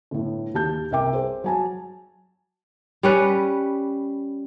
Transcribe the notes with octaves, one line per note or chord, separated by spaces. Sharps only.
G1 A2
D#2 G4 A5 G6
C2 A#4 E5 G5 D6
G#4 C5
F#3 G#5 A5
G3 C#4 B4